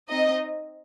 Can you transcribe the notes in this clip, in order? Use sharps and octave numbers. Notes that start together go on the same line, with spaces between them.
C4 D#4 D#5